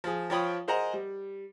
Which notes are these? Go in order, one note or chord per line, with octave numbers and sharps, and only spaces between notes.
F3 G#4
F3 F4 C#5 G5 B5 D#6
G#4 A#4 C5 D#5 F#5 A#5
G3